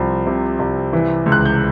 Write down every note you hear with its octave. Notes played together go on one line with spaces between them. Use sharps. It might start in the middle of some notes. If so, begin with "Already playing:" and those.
Already playing: C2 F3
C3
C2
E3
C#2
F#6
G6